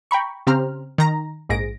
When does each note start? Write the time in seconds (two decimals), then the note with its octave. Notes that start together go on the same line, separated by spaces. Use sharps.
0.11 G5 A#5 B5 C#6
0.47 C#3 C4 G4 C5 A#5 F6
0.98 D#3 A#5 A#6
1.49 A#1 G#2 G#4 A#6 D7